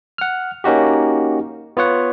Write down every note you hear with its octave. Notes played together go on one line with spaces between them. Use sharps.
F#5 F6
A#3 C#4 D#4 F#4 G4
B3 F4 C#5 F#5